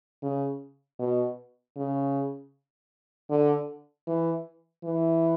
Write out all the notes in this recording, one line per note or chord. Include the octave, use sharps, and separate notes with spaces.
C#3
B2
C#3
D3
E3
E3